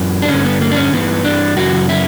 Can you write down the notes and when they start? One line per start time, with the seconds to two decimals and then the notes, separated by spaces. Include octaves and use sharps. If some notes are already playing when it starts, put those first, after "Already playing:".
Already playing: F#2 E3
0.22 D4
0.29 G2 D3 C#4
0.45 B3
0.61 A#3
0.71 D4
0.77 C#4
0.93 G2 E3 B3
1.24 D4
1.57 F#2 C#3 E3 F#4
1.89 E4